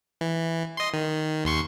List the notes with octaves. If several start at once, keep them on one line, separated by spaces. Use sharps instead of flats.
E3
D#5 C6
D#3
D#2 C6 C#6